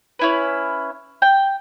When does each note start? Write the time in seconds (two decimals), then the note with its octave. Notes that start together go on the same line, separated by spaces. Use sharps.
0.19 C#4 E4 B4
1.22 G5